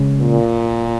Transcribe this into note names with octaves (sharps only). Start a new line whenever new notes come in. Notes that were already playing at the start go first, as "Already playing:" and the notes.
Already playing: C#3 G#3 C#4
A#2